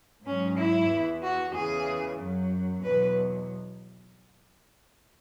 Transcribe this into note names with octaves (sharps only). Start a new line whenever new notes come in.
G#2 F#3 C#4
E4
E2 E3
F#4
E2 C#3 E3 G#4
F#2 F#3
E2 B2 F#3 B4